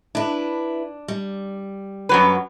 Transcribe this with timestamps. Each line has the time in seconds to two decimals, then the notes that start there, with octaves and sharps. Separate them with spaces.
0.15 D4 E4 B4
1.08 G3
2.09 F#2 F#3 B4